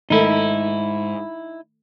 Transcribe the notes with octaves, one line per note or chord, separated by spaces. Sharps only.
G#2 D#3 A3 D#4 E4 A4